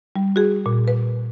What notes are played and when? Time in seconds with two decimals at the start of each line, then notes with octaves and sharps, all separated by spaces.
0.16 G3
0.36 F#4 G#4
0.66 A#2
0.88 B4